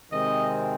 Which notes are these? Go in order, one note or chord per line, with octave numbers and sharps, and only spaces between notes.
C3 D#3 G#3 C4 D#5